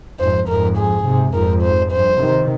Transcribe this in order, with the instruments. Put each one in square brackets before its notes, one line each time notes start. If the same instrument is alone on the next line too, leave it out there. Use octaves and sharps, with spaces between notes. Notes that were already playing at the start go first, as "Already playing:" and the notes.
[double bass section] F2 G#2 [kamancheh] C5
[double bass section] F2 G#2 [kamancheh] A#4
[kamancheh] G#4
[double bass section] G#2 C3
[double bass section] F2 G#2 [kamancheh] A#4
[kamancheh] C5
[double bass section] G2 [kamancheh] C5
[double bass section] C3 D#3